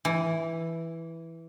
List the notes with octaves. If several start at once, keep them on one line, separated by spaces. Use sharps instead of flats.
E3